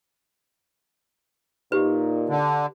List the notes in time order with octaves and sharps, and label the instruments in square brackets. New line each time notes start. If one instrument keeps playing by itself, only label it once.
[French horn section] A#2 D#4 [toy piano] G4 B4
[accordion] D3